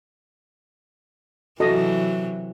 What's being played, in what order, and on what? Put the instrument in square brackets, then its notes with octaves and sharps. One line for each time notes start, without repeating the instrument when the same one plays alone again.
[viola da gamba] C3 E3 F#3 [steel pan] F#4 A4 D#5